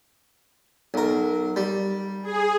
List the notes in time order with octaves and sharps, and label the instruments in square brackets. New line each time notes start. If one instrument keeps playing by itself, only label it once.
[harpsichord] B1 A#4
G3
[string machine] G#4